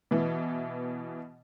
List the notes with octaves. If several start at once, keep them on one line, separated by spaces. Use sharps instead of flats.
B2 E3